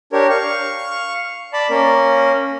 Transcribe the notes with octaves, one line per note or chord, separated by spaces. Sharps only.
D4 G4 A#4 C#5
F5 C#6
D5 A5 B5
A#3 C#4 A#4